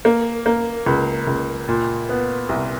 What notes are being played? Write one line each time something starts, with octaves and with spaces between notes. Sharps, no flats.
A#3
A#3
C#2
C#2
A#2
B3
C2